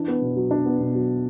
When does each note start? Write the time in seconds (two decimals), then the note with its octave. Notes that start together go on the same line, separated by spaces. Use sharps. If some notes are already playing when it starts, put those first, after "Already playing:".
Already playing: E3 D4
0.08 B3
0.22 B2
0.36 F#3
0.51 D4
0.66 B3
0.80 B2
0.95 F#3